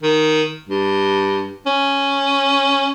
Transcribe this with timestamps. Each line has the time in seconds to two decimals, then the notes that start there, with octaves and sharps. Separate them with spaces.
0.03 D#3
0.69 G2
1.66 C#4